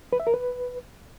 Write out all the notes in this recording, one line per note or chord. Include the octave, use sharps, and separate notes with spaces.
B4
E5
A#4
B4